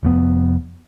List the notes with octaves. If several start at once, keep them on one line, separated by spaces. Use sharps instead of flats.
F1 F2 B3